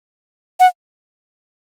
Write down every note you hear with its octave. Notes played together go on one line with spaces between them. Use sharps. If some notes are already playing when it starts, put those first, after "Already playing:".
F#5